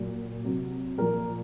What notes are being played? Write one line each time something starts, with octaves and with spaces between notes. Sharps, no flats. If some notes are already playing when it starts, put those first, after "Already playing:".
Already playing: A#2 F#3
C3 F#3
A#2 F3 A#4